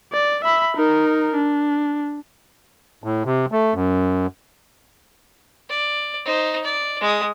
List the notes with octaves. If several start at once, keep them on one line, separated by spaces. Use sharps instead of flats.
D5
E5 B5
D#4 A#4
D4
A2
C3
A3
F#2
D5
D#4 C5
D5
G#3 D#6